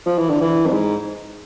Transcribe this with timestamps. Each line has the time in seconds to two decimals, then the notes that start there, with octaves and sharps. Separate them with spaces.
0.06 F3
0.18 E3
0.29 D3
0.41 E3
0.66 F2
0.73 G#2